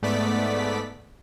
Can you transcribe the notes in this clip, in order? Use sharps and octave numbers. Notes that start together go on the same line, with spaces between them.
G#2 A3 B3 D5 B6